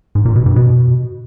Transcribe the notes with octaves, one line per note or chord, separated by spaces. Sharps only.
G#2
A#2
B2
G2
B2